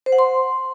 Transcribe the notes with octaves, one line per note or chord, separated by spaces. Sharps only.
C5
F#5
C6